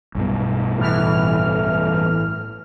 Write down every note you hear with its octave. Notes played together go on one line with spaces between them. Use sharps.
B1 G2 B2
A2 E3 F6